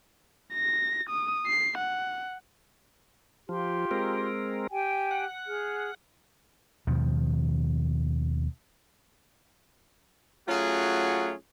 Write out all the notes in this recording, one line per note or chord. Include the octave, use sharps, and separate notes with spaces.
A#6
D#6
C7
F#5
F3 F4 G4 C6
G#3 C4 A#4
G4 G5 G#5
F#5
G#4 F6
D#2 B2 D#3 F3
F#3 A3 C#4 F4 F#4 G#4